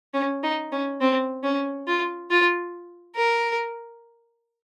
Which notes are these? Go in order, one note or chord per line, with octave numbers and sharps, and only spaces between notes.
C#4
D#4
C#4
C4
C#4
F4
F4
A#4